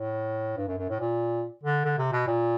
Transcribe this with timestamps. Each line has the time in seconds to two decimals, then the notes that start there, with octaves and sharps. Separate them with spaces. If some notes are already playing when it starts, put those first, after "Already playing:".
Already playing: A2
0.57 G2
0.68 F#2
0.78 F#2
0.89 A2
1.00 A#2
1.63 D3
1.84 D3
1.98 C3
2.12 B2
2.27 A#2